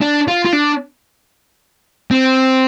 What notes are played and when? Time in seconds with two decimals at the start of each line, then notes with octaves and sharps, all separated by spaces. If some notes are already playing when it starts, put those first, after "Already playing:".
0.01 D4
0.28 F4
0.45 F4
0.53 D4
2.11 C4